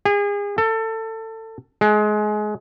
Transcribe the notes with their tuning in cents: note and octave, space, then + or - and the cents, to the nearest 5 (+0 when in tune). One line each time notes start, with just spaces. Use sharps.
G#4 -35
A4 +25
G#3 +25